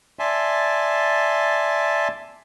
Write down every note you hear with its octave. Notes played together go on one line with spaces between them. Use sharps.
D5 E5 G#5 A5 C6